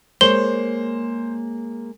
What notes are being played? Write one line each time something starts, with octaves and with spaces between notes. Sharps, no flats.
G#3 A#3 C5 C#5 G7